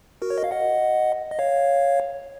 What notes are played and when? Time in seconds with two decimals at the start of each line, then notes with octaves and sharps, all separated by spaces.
0.22 F#4 A#4
0.30 C#5
0.38 D#5
0.44 F5
0.51 D#5 F#5
1.31 D#5
1.39 C#5 F5